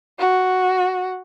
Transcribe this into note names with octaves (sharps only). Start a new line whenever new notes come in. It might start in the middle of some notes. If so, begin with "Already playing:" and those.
F#4